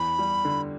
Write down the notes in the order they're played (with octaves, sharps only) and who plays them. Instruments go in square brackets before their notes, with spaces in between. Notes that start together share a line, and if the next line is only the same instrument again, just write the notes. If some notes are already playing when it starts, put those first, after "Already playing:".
Already playing: [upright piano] E2 [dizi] B5
[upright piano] G3
D3